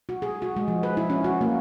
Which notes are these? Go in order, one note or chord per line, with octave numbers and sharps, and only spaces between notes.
F#4
G#4
F#4
G#3
F3
B4
E4
C#4
F#4
A#3